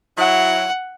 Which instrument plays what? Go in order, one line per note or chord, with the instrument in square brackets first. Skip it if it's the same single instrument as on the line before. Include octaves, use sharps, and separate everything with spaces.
[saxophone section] F#3 E4 [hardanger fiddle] F#5